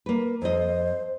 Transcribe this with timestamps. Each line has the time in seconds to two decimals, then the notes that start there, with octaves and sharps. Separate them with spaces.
0.06 A#3 B4
0.42 F2 C5 D#5